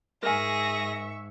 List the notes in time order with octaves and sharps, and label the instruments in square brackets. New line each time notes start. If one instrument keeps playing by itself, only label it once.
[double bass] G#2 [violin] G#4 A#6 [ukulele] A#4 G#5 [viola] E5 C#6